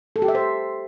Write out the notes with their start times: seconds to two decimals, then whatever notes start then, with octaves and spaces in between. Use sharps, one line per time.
0.16 A4
0.22 G4
0.28 E5
0.35 C5